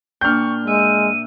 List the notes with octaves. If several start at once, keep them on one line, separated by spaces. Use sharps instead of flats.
A#2 D4 G5 C#6 F6 G6
G#3 E5 D#7